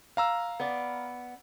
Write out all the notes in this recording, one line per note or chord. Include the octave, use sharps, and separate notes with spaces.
F5 A#5 E6
B3 D5